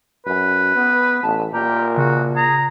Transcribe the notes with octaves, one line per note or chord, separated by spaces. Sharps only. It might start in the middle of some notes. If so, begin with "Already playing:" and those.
F#2 B4
B3
A1 A5
A#2 G4 A#4 A#5
C#3 F#4
G#4 A#5